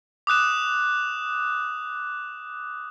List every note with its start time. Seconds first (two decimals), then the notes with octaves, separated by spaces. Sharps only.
0.27 D6 D#6 F#6 E7